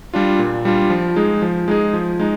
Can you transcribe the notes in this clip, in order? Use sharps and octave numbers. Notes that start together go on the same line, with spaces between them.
G3 D4 F4
A#2
G3 D4 F4
F3
G#3 D#4 G#4
F3
G#3 D#4 G#4
F3
G#3 D#4